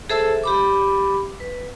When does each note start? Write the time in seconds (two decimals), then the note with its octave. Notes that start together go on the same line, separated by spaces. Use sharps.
0.10 G#4 A4 C5 E5 A5 E6
0.44 G4 B5 D6
1.40 B4